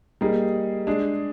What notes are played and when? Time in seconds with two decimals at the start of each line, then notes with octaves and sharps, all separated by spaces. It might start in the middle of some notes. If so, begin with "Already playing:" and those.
0.21 G3 A#3 D#4 G#4
0.87 G#3 D4 G#4